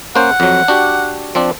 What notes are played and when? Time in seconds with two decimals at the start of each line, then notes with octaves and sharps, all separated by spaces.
0.15 A#3 C#4 C5 F#5
0.40 F2 F#3
0.68 D4 F#4 G4
1.35 F3 C4 D4